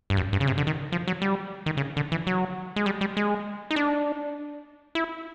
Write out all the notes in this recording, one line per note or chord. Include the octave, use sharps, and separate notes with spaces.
G2
F#2
G2
C#3
C3
D3
D#3
F3
F#3
G3
D#3
C#3
D3
E3
F#3
G#3
G3
G3
G#3
D#4
D4
E4